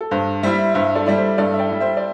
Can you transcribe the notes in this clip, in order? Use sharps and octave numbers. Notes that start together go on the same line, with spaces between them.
A4
G2 C5
G3 E4 C5 E5
G2 C5 E5
A4 D5
G3 E4 D5
C5
G2 A4 D5
E5
D5 G5
G3 E4
C5 E5
D5